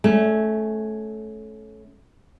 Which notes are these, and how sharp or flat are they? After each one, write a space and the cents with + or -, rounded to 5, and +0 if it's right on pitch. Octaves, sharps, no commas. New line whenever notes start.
A3 -20 C#4 +0